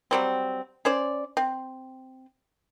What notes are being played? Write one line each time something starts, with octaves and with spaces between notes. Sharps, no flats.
F#3 G3 C4
C#4 C5 D5
C4